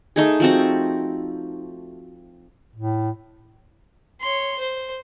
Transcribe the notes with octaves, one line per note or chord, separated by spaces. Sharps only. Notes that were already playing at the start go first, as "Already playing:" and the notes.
A3 D#4 G#4
F3 C4 F#4
A2
C#5 C6
C5